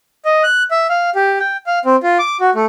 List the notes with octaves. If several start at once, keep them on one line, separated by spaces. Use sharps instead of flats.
D#5
F#6
E5
F5
G4
G5
F5
C4
F4
D6
F#4
A3